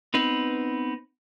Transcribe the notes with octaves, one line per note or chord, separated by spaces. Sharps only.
B3 C4 D#4 B4